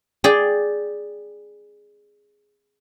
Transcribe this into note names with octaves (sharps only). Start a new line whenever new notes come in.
G#4 D5 G5